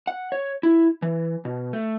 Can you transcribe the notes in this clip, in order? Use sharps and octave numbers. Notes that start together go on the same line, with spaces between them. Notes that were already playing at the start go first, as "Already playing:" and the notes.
F#5
C#5
E4
E3
B2
A3